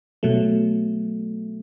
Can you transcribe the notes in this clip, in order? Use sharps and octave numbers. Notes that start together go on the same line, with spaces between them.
B2 F#3 A3